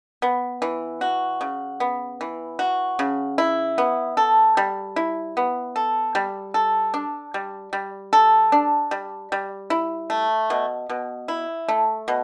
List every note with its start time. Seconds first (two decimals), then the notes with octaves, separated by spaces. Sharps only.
0.22 B3
0.62 E3
1.01 F#4
1.41 C#3
1.80 B3
2.21 E3
2.59 F#4
2.99 C#3
3.38 E4
3.78 B3
4.17 A4
4.57 G3
4.96 E4
5.37 B3
5.76 A4
6.15 G3
6.54 A4
6.94 D4
7.34 G3
7.73 G3
8.13 A4
8.52 D4
8.91 G3
9.32 G3
9.70 E4
10.10 A3
10.50 B2
10.90 B2
11.28 E4
11.69 A3
12.08 B2